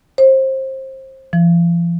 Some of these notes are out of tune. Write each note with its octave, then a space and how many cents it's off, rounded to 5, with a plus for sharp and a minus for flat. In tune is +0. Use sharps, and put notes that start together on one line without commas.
C5 +25
F3 -45